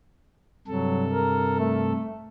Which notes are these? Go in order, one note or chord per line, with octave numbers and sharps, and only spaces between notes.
G2 C3 F#3 A4
A#4
A3